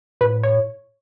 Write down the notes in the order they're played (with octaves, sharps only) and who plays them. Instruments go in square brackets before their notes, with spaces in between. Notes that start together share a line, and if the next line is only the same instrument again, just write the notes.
[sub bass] A2 [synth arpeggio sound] B4
[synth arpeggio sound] C#5